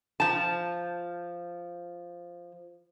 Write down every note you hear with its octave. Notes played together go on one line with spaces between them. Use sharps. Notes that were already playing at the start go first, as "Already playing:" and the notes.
F3 A5